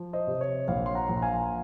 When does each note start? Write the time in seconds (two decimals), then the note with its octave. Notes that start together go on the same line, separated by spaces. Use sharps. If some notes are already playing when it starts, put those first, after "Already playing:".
Already playing: F3
0.13 C5 D#5
0.27 C3
0.41 C#5
0.68 A#1 C#5 F5
0.86 C6
0.95 F#5 A#5
1.09 A#1
1.17 A#5
1.22 F5 G#5